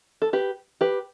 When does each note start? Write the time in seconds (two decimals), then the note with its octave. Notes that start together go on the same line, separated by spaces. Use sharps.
0.22 A4
0.33 G4 B4
0.81 G4 B4